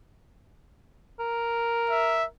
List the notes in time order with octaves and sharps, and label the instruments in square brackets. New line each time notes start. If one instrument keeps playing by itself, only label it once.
[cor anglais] A#4
[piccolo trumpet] E5